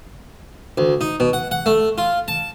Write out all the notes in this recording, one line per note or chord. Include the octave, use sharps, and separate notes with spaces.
D2
D#4
B2
F#5
F#5
A3
F4
A5